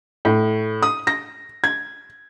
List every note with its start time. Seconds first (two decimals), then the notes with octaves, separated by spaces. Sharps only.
0.25 A2
0.83 D#6
1.07 A#6
1.64 G#6